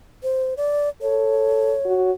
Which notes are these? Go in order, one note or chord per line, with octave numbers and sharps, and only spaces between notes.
C5
D5
A4 C#5
F#4